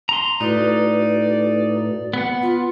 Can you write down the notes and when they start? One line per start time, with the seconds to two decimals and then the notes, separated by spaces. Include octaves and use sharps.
0.09 A#5 C6
0.41 A2 D#4 F#4 B4 D5
2.13 B3 F#5
2.42 F4